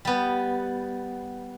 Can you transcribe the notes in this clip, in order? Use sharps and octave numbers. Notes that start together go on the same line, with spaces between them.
G3 B3